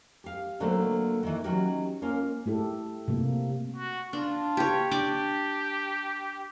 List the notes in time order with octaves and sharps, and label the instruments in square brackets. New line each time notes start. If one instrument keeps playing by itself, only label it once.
[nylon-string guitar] G4 F5
A#2 D3 F#3 A3 A#3 C4
D#3 E3
F#3 C#4 D#4 F#4 G4
A#3 C#4 F4
[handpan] A3 E4 G4 A4
C3 A3 A#3
[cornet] F#4
[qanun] D4 [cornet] F4
[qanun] G4 C#5
[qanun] D4 D5 D6 [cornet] G4